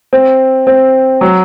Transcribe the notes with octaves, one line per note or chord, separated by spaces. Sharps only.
C4
C4
F#3